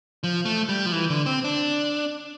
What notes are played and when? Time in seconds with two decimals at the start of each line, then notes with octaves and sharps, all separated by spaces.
0.23 F3
0.45 A3
0.69 G3
0.86 F3
0.92 E3
1.10 D3
1.26 C4
1.44 D4